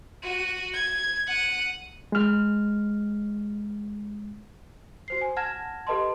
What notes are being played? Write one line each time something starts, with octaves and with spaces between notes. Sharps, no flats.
F#4 D#7
G#6
F#5 D#7
G#3 F6
F#4 C5 C7
G#5
F#5 A5 F6 G#6 A#6 E7
G4 A4 B4 D#5 A5 C6